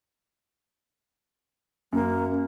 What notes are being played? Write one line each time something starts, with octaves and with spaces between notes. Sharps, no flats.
F#2 A#3